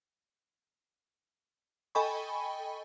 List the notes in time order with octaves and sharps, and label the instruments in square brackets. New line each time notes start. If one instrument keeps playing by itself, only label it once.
[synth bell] A4 D#5 G5 G#5 B5 C#6